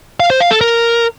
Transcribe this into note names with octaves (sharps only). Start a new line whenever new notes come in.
F5
C5
F5
A4
A#4